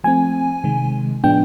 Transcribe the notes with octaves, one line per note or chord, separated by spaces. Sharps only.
F3 A3 C4 G#5
C3 D#3 G#3
A2 F3 G#3 B3 D4 G5